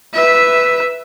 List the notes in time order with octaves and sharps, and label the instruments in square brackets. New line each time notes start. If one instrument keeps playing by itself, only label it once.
[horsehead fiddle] B4 E5